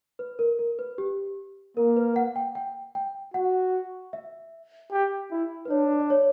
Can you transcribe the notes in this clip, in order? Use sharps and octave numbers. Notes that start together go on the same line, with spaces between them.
B4
A#4
A#4
B4
G4
A#3 A#4
B4
F#5
G5
G5
G5
F#4 F#5
E5
G4
E4
B4
D4 C#5
D5
C#5